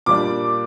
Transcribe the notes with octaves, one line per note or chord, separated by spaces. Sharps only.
A#2 G3 D4 D6